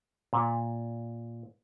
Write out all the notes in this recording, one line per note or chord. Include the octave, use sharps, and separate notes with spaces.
A#2